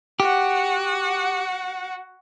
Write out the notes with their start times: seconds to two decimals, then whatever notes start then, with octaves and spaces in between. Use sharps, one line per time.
0.20 F#4 G4 F#5